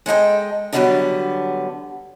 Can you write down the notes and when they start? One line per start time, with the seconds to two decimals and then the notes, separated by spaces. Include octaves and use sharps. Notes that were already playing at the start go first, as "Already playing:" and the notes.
0.06 G#3 A4 D#5 G5
0.73 D3 F#3 G3 B3 D4 D#4